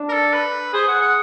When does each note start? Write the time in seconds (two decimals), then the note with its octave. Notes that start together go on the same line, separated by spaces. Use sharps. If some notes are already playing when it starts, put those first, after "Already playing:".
Already playing: D4
0.09 A#4
0.13 A4
0.33 B4
0.74 G#4 C5
0.88 F#5
1.01 F#5